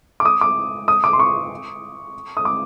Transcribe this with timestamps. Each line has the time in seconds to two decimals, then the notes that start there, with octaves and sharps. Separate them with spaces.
0.20 D6
0.25 D#6
0.41 D6
0.88 D#6
1.04 D6
1.13 C6
1.19 C#6
2.37 D#6
2.45 D6